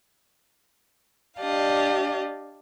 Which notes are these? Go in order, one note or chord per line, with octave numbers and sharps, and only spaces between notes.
D4 G4 D5 D#5 F5